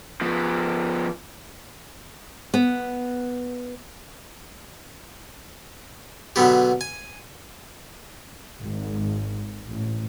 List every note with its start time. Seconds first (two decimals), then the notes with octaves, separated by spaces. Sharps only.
0.21 F3 B3
2.54 B3
6.36 B2 D3 F#3 B3 G4
6.81 G#5
8.61 G#1
9.69 A1